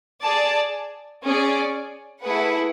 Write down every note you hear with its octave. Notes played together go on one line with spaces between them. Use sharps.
G#4 D5 A5
C#4 G#4 D5
A3 E4 G#4 B4 F#5